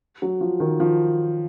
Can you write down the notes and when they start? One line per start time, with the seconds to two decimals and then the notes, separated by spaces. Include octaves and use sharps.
0.22 F#3
0.41 F3
0.60 D#3
0.80 F3